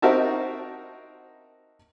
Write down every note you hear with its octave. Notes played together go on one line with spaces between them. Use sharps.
C4 D#4 F#4 A#4 E5 A5